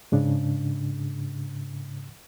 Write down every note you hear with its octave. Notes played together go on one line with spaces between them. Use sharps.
G#2 C#3 D4